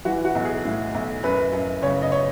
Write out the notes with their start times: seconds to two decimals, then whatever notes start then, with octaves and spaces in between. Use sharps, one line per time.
0.05 E3 F#4
0.25 F#4
0.35 B1
0.45 G#4
0.65 A2
0.94 B1
1.23 F#2 B4
1.52 F#2
1.82 C#3 C#5
2.02 D#5
2.12 C#5